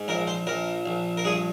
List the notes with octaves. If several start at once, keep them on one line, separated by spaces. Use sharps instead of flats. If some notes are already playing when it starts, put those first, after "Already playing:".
Already playing: G#2
A#1 A#4
C5
A#1 A#4
A#1
A#4
G2 G#4